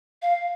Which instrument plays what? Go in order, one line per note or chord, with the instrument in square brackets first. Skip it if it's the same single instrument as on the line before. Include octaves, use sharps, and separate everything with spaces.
[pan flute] F5